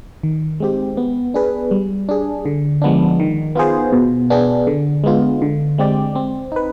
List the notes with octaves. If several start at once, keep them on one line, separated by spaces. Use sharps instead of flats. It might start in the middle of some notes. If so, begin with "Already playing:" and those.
D#3
G#3 C4 G4
B3
D4 G#4 B4
G3
D4 G#4
D3
F3 G#3 B3 D4
D#3
B3 F4 G#4 C5
B2
B3 D4 G#4
D3
G#3 B3 F4
D3
G#3 C4 G4 D5
C4
D#4 B4